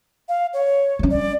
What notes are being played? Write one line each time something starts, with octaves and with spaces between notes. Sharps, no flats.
F5
C#5
G3 C#4
D5